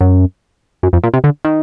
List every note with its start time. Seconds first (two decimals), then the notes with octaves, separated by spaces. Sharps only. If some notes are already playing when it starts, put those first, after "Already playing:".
0.01 F#2
0.83 F#2
0.93 F2
1.03 A#2
1.14 C3
1.24 D3
1.45 D#3